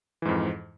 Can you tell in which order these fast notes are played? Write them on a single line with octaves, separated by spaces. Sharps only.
E3 G#2 F2